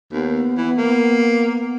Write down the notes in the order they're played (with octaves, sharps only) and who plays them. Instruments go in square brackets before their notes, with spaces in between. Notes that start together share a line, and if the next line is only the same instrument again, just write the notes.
[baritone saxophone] D#2 [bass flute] B3
[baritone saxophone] E3
A#3